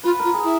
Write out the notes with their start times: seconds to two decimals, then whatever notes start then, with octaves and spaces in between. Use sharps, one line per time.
0.04 F4 B4
0.19 F4 A#4
0.34 G#4
0.44 E4